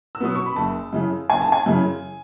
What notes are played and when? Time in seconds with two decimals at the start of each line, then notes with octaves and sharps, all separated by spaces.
0.15 E6
0.20 B2 F#3 B3 D#6
0.35 C#6
0.46 B5
0.56 F#1 A5
0.93 F#2 C#3 E3
1.30 F#1 G#5
1.41 A5
1.52 G#5
1.66 F#2 C#3 E3